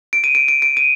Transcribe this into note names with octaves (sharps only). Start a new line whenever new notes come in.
D7
D#7
D7
D7
D7
D#7